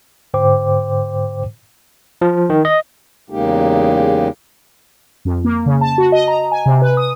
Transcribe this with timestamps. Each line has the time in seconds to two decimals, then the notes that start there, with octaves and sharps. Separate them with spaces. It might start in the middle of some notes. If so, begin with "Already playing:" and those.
0.34 G#2 D3 C5 G5 D6
2.21 F3
2.50 D#3
2.65 D#5
3.30 E2 C#3 G#3 A#3 D#4 G4
5.25 F2
5.45 A#3
5.66 C#3
5.81 A5
5.98 F#4
6.12 D#5
6.28 A#5
6.51 G#5
6.66 C3
6.82 B4
6.97 D#6